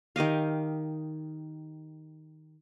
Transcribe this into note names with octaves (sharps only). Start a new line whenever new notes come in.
D#3 G4 D#5 F5